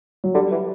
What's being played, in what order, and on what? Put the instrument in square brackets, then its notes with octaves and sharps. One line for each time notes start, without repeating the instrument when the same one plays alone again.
[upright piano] F#3
[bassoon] D3 [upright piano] G3
[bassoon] E3